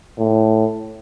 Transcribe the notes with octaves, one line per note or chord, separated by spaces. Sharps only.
A2